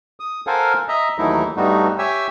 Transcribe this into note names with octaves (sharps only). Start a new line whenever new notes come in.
D#6
A4 A#4 C5 F5 F#5 G#5
D#5 E5 A#5
D#2 E3 F#3 A3 D#4 E4
G2 G3 A3 B3 D#4 F#4
G4 C#5 E5 G#5 E6